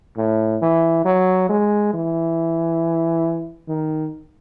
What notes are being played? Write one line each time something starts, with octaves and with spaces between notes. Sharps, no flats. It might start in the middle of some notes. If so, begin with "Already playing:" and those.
A2
E3
F#3
G#3
E3
D#3